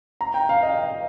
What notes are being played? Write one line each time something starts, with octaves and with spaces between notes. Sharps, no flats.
A#5
G5
F5
D#5